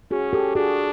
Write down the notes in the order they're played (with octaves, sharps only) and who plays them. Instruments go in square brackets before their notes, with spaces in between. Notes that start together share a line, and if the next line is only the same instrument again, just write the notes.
[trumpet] C#4 [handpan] F#4 G#4
[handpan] G4 A4
[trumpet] D4 [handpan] F#4 G#4